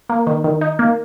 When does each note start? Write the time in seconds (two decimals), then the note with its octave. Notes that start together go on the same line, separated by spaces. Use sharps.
0.09 A#3
0.27 D#3
0.44 D#3
0.61 D#4
0.79 A#3